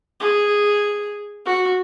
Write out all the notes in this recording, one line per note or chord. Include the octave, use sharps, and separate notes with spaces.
G#4
F#4